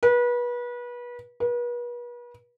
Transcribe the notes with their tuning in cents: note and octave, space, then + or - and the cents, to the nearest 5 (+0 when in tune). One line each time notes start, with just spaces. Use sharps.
B4 -30
B4 -40